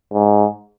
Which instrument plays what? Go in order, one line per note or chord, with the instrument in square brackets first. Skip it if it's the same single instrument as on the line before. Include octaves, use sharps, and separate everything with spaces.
[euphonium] G#2